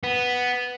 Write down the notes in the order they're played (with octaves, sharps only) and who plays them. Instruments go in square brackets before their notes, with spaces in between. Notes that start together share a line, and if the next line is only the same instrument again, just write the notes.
[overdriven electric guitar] B3